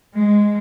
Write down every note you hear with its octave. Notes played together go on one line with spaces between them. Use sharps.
G#3